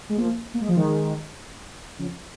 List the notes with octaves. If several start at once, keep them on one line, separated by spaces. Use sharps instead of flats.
G#3
F3 A#3
A#3
G#3
F3
D#3 G#3
C#3 F3